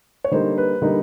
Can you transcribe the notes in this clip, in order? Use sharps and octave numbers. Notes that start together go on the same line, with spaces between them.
C#5
D3 G3 A#3 D#4 C5
B4
D3 G3 A#3 D#4